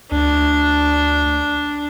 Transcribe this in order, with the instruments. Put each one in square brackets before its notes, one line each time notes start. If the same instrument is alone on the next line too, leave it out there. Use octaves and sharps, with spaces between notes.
[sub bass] D2 [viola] D4